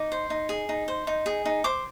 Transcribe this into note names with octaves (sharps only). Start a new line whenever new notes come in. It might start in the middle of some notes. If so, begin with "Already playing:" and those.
Already playing: D#4 D6
C5
D#4
G#4
D#4
C5
D#4
G#4
D#4
C5 D6